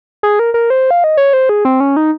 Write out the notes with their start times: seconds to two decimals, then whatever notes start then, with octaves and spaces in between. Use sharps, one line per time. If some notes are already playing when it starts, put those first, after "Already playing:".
0.23 G#4
0.39 A#4
0.54 A#4
0.70 C5
0.91 F5
1.04 D#5
1.17 C#5
1.33 C5
1.49 G#4
1.65 C4
1.80 C#4
1.97 D#4